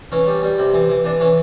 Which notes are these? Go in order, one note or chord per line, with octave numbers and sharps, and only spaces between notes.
E3 C#4
G3
G3
C3
E3
E3
E3 D4
E3 C#4